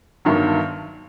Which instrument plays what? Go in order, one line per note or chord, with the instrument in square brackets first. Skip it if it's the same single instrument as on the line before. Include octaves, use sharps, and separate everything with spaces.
[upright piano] G1 G2 D#3 F#3